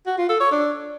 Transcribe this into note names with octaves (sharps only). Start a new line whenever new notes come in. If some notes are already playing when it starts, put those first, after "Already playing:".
F#4
F4
A4
C#5
D4